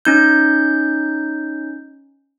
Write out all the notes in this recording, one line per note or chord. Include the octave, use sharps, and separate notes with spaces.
C#4 D#4 G6